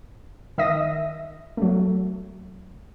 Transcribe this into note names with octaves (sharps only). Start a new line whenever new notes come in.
D#3 D#5 E5 D#6 A#6
F#3 A3